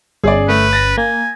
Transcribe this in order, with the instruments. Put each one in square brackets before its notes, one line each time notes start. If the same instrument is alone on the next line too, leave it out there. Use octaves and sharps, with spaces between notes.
[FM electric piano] G1 C#4 [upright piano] G#4 D5
[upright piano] A3 [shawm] B4
[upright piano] A6 A#6
[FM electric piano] A#3 [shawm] G#5